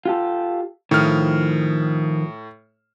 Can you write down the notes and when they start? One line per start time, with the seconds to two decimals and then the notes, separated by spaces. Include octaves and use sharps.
0.05 F4 G4 A4
0.91 A2 D#3 F3 F6